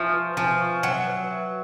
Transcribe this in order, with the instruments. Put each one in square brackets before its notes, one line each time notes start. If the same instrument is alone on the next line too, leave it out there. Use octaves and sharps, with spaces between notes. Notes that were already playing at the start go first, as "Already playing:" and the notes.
Already playing: [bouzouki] F3 [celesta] E5 G#5 C#6
[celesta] B4
[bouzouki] F3 [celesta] G#5
[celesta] C#6
[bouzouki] F#3 [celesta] E5
[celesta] B4
E5